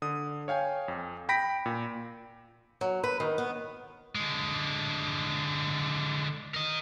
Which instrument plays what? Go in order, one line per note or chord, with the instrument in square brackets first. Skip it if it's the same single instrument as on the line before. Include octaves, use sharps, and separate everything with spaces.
[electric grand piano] D3 D#6
C#5 F5 G5 G#5
F2
G5 B5 A#6 B6 D7
A#2
[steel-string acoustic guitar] F#3
B4
D#3
B3
[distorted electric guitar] D3 G#3
A#4 D#5